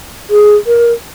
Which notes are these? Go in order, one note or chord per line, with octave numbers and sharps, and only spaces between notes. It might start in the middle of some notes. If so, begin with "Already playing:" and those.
G#4
A#4